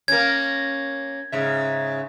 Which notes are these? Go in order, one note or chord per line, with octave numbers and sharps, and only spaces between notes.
A#3 C#4 G#6
G#2 C#3 E5